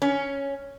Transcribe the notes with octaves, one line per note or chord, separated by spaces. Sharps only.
C#4